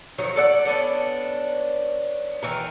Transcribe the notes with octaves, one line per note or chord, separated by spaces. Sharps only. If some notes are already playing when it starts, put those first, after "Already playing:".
D#3 F3 F#3
A4 D5 F#5
B3 C#4 D4 A4
D#3 E3 A#4